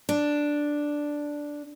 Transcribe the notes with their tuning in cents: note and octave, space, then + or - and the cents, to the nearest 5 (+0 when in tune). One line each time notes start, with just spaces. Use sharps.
D4 +0